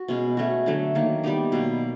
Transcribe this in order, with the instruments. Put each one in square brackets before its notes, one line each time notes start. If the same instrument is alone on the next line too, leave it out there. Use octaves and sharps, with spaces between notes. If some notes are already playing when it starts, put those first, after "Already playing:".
Already playing: [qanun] F#4
B2 G#3 C#4
A3 C#4 F#4
D3 F#3 A3
D#3 F#3 A#3
G3 B3 D#4 G4
B2 F#3 A#3